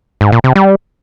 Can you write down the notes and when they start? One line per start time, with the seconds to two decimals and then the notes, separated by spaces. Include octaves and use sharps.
0.21 G#2
0.32 A#2
0.44 C3
0.56 G3